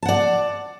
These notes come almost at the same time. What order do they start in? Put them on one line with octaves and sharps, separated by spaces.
A5 F#5 D5